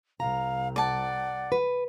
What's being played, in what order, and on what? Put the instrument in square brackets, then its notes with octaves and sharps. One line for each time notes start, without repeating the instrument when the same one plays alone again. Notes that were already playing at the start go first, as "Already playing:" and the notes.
[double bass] C2 [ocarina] F5 [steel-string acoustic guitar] A#5
[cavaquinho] D5 A5 [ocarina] F#5
[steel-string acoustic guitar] B4